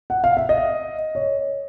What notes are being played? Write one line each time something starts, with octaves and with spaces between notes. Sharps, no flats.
F#5
F5
E5
D#5
C#5